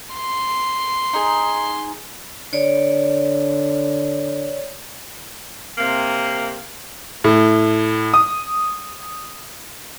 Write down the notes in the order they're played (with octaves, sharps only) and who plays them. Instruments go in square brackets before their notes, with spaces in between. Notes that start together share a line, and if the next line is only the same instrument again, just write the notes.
[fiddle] C6
[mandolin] D#4 G#4
[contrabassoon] D3 [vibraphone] C#5 D5
[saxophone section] C3 A#3
[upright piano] A2
D#6